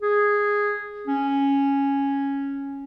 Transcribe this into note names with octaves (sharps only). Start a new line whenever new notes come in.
G#4
C#4